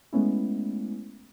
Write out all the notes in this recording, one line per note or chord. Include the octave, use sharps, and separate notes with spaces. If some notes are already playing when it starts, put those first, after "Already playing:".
G#3 A3 B3 C#4 E4